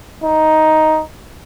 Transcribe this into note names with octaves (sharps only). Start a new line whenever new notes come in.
D#4